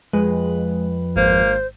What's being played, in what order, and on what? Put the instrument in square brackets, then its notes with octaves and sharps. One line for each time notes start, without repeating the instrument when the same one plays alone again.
[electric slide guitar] F2 B4 [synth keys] G#3
[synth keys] G#1 [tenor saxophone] A#3 [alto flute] C5